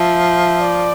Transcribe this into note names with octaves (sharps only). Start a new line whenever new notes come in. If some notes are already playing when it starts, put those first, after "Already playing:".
Already playing: F3 E5
D5